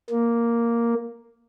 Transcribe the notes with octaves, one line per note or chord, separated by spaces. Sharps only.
A#3